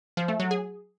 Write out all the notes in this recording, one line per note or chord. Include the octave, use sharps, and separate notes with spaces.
F3
A3
F#3
G#4